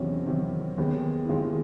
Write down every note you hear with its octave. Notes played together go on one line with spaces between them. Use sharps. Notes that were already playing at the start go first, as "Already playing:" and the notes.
Already playing: E2 C3 D#3 F#3 C#4
E2 C3 D#3 F#3
D#2 D#3 G#3 B3
E4
D#2 D#3 G#3 F4